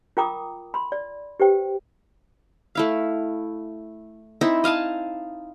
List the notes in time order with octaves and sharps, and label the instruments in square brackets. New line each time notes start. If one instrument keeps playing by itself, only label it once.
[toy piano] F4 A#4 G5 A#5 D6 D#6
B5 C6
D5
G4 B4 C5 G5
[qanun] A3 E4 F5
C4 D#4 E4
D#5 F5 G#5 A5